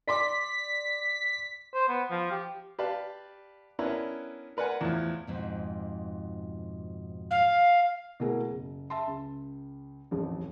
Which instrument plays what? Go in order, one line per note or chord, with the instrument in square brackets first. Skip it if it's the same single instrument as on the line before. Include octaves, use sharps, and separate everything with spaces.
[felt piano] D5 C6 D6 [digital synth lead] B6
[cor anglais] C5
B3
F3
G4
[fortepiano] G4 B4 D5 F5 A5
B3 C#4 D4 E4 A#4 B4
A#4 B4 D5 F#5 G#5
E2 A2 F3
[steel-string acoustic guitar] F2 G#2 B2
[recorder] F5
[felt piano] B2 A3 A#3 E4 G#4 A#4
F#1
E5 A5 C6
C#2
D#1 A1 F2